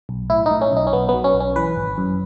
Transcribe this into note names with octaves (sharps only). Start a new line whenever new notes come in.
B1
A2 E4
D#4
A2
C#4
B1 D#4
C#4
B1 B3
B3
F#3
C#4
B1
C#4
E3 B4
G#1
F#2